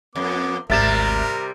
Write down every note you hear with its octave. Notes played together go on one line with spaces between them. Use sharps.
F2 B3 D6
G#1 D2 C3 G3 A#4 E5 A6 E7